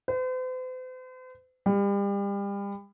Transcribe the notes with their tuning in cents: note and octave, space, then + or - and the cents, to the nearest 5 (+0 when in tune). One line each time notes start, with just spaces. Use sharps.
C5 -45
G3 +35